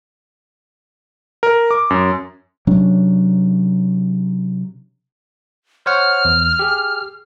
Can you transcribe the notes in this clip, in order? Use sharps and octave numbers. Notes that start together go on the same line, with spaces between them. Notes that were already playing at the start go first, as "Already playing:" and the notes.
A#4
D6
F#2
C3 F#3 C#4 D4
C5 C#5 F#5 F6
E2
G4 G#4